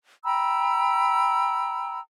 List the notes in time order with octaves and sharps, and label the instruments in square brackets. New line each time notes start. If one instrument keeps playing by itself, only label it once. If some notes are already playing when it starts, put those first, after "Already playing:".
[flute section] G5 A#5 B5 E6